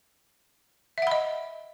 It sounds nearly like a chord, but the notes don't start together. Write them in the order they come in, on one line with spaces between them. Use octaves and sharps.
E5 F#5 B5 D#5